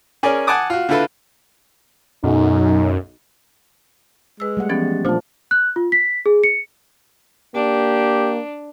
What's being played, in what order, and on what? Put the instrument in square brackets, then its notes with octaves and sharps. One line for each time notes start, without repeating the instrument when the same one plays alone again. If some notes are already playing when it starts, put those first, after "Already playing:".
[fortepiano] C#4 G#4 A#4 D5
F#5 G#5 A5 D6 D#6
F4 F#4
D3 E4 F4 A4 B4
[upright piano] B1 [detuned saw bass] F#2 [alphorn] D#4
[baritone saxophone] G#3 [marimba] B4 E6
[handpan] G3 A3 F#5
[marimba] E3 F3 B3 [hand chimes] C#4 G4 A6
[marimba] A#2 F3 F4 [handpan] A3 A#3 D4 [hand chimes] C5 A5
[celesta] F#6
F4
B6
G#4
C#7
[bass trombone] A#3 [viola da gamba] D4 [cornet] G4